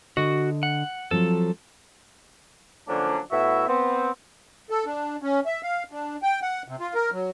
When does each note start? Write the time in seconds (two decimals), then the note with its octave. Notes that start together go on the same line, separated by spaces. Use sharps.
0.17 D3 F#4 D#5
0.63 F#5
1.11 F3 F#3 C4 A4
2.88 D3 F3 F#3 A#3 C#4 D4
3.31 A2 B3 E4 F#4 E5
3.68 B3 C4
4.70 A4
4.86 D4
5.22 C#4
5.46 E5
5.63 F5
5.92 D4
6.23 G5
6.42 F#5
6.68 C3
6.80 F4
6.95 A#4
7.12 F#3